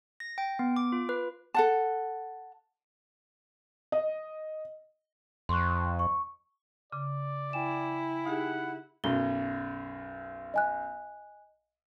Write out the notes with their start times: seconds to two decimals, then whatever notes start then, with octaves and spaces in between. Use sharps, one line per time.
0.20 A#6
0.38 G5
0.59 B3
0.76 D6
0.92 F4
1.09 B4
1.54 A4 F#5 A5
3.92 D#5
5.49 F2 C6 C#6 F#6
5.99 C#6
6.92 C#3 D5 D6
7.53 E4 G5 G#5 E7
8.25 D#4 G4 G#4 F#5
9.04 B1 F#2 B2 G7
10.54 D#5 G#5 F#6